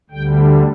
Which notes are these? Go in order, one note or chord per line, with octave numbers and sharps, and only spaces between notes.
D2 D3 G3 G5